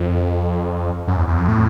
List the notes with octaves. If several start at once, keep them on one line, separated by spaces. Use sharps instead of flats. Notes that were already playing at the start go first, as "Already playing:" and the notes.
Already playing: F2
F#2
E2
E2
F2
A2